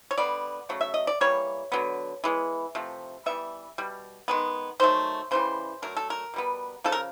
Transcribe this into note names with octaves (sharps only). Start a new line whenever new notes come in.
C#5
D3 G3 B3 D5
C#3 F#3 A3
E5
D#5
D5
E3 G3 A#3 C#5
D3 F#3 B3
E3 G#3 B3
C3 F3 A3
E3 G3 B3 E5
B2 G3
D#3 G#3 B3
D#3 F#3 A3 C5
C#3 E3 G3 C5
D3 F#3 A3 A#4
A4
A#4
B2 G3 B3
C#3 F3 A4
A#4